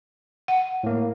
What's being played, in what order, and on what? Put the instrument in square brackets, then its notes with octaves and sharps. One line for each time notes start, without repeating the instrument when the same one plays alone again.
[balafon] F#5
[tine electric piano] A2 A#3